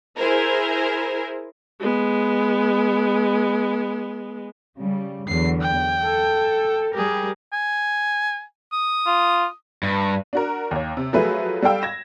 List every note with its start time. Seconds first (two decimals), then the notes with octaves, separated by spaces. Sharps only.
0.18 E4 G#4 A#4 C5
1.80 G#3 B3
4.78 C#3 G3
5.28 E2 D3 F#3 C7
5.61 G5
6.03 A4
6.94 G3 G4 G#4 A#4
7.53 G#5
8.73 D#6
9.07 F4
9.83 G2
10.33 D4 F#4 A#4
10.71 D#2 C#5
10.97 C3
11.13 F3 F#3 A3 G#4 B4 E5
11.62 G3 A4 F5 G5 E6
11.82 G#6 A#6 E7